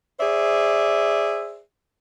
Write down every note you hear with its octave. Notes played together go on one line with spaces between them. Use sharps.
G#4 C5 D5 E5